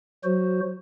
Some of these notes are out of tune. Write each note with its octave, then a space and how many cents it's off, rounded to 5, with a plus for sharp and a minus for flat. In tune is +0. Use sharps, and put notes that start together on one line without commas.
F#3 +0 F#4 +0 C5 +0